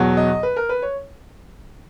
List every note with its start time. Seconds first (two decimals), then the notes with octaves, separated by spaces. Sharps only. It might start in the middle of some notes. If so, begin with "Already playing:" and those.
Already playing: E2 B2 F#3
0.17 D#5
0.43 B4
0.57 A#4
0.69 B4
0.82 C#5